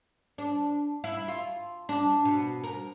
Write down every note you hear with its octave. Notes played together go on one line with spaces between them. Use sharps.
D4
E4
F4
D4
B2
A#4